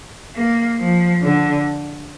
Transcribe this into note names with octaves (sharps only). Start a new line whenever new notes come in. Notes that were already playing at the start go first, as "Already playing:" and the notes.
A#3
F3
D3